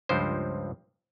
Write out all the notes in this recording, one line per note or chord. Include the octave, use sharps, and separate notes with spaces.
C#2 G2 F3 C5